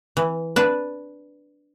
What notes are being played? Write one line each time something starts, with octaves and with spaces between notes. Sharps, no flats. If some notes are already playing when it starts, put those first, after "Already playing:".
E3
D4 B4